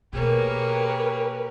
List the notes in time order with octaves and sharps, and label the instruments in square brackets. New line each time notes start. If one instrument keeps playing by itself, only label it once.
[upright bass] B2 [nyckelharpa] A#3 G#4 [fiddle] G4 C#5 [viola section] A#4 B4